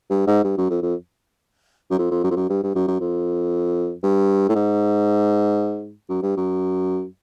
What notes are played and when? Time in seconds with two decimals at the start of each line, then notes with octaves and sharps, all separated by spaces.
0.10 G2
0.27 G#2
0.44 G2
0.58 F#2
0.70 F2
0.82 F2
1.91 F#2
1.98 F2
2.11 F2
2.24 F#2
2.30 F2
2.36 F#2
2.49 G2
2.63 G2
2.75 F#2
2.87 F#2
3.00 F2
4.03 G2
4.49 A2
4.55 G#2
6.09 F#2
6.22 G2
6.37 F#2